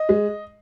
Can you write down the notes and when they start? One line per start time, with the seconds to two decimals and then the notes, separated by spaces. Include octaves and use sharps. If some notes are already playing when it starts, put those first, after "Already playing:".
Already playing: D#5
0.09 G#3